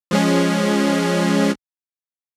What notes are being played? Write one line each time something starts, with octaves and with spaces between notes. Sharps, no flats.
F3 G#3 C#4